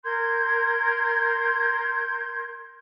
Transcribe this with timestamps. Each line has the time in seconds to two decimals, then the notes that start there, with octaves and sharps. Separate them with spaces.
0.05 A#4 C6 G6 G#6